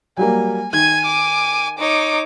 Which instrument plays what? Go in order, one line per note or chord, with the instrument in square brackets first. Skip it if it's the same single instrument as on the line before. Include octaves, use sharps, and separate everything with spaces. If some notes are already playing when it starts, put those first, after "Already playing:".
[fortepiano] F#3 G3 A#3 [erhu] G#5
[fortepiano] D#3 [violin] G#5 D#7 [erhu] G#6
[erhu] D6
[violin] D#4 C#5 [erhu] D6